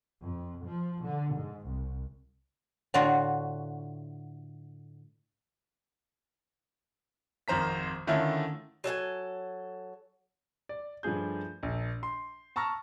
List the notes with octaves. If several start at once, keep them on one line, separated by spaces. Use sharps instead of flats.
F2
F3
D3
G#2
C2
A2 D3 F4 F#4
G#1 F2 D#3 C5 A#5 B6
D3 D#3 A3 C#4 E4 F4
F#3 A4 D#5 G#5
D5
G2 F3 A3 G#4 G6
A#1
C6
A5 A#5 C#6 E6 F6 A#6